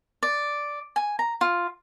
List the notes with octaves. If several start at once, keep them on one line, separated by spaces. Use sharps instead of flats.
D5
G#5
A#5
F4